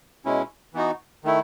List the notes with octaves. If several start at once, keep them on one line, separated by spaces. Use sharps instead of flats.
B2 G#3 C#4 E4
E3 B3 D#4 F#4
D#3 A3 E4